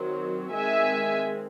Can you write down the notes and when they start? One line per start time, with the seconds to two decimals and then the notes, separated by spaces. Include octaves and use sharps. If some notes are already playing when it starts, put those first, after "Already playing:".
Already playing: D#3 F#3 C4
0.51 D#3 G#3 C4 E5 G#5